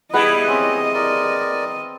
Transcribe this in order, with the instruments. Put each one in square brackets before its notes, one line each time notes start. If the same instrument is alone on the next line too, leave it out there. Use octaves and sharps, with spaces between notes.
[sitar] G3 E4 [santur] B3 G#4 F#5 [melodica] B4 [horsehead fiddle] D#5
[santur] C4 [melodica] C#4
[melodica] A#4 D5